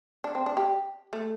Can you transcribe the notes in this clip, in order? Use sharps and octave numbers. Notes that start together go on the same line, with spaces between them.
D4
C4
D4
G4
A3